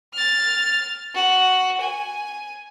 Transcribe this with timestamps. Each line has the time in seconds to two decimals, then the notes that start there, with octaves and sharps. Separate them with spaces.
0.14 F6 A6
1.14 F#4
1.80 G#5